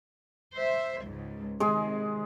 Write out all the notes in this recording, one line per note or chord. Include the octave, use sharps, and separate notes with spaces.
C5 E5
C#2 G#2
C3 D#3 G#3 G#4